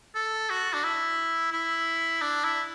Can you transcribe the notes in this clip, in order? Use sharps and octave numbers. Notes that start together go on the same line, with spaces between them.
A4
F#4
D4
E4
E4
D4
E4